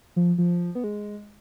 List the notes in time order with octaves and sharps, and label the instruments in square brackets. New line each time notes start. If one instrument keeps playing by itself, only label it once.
[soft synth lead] F3
F3
B3
G#3